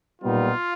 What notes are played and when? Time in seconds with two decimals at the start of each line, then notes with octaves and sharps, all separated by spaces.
0.22 B1 A#2 G3 B3 D#4 F4